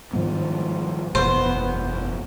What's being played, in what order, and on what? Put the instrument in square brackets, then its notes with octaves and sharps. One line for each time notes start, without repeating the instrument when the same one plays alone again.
[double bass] G#2 F3 [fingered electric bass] D#3 G3 B3
[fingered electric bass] F#1 E2 B2 [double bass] B3 [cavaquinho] C5